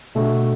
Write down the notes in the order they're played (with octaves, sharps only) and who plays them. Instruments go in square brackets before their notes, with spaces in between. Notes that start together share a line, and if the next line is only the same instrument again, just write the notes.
[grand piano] B2 A3 D4 F#4